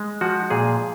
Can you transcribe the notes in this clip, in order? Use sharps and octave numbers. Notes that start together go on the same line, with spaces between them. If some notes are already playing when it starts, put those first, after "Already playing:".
Already playing: G#3
F3 F#4
A#2 G#4